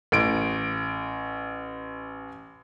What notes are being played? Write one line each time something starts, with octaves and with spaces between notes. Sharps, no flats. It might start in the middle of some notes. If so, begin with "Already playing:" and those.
A1 D7